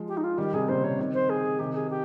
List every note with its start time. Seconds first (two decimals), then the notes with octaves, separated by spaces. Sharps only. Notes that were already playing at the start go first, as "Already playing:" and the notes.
Already playing: F3 G#3
0.08 G4
0.17 D#4
0.24 F4
0.38 D#3 G3 G4
0.53 C3 D#3 G#4
0.68 A#2 C#3 C5
0.84 C3 C#5
0.99 C3 D#3
1.14 C5
1.30 G#4
1.59 C3 D#3 G4
1.74 G#4
1.90 G4